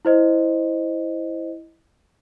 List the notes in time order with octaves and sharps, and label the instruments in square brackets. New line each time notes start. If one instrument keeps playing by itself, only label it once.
[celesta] E4 C5 D#5